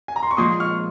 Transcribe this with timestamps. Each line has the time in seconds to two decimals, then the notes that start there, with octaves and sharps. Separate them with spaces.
0.08 G#5
0.16 A#5
0.23 C6
0.31 C#6
0.37 A#2 F3 G#3 C6 D#6
0.60 C#6 F6